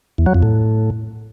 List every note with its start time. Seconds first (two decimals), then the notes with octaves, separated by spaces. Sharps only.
0.18 E2
0.26 F#3
0.34 F2
0.43 A2